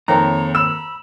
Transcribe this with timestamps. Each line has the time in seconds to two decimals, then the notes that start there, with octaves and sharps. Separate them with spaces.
0.08 F2 D#3 A#3 C4 C#5 A#5
0.55 B5 E6 E7